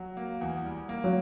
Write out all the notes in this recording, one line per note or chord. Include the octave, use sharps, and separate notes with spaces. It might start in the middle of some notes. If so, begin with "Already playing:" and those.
Already playing: F#3
A#3
E2
G3
A#3
F#3